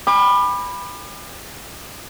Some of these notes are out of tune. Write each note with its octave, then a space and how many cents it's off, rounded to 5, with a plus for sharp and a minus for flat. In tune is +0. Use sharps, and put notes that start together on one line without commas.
G#5 -45 B5 +0 D6 +35